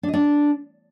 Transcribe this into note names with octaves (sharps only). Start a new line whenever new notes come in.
D4
D#5
D4